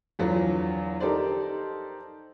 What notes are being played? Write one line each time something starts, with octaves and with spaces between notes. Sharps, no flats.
E2 D3 F3 F#3 B3
D#4 G4 A4 A#4 C5 D5